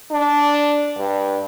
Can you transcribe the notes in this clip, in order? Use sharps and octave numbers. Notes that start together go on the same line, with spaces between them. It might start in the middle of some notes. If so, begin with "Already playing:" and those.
D4
G2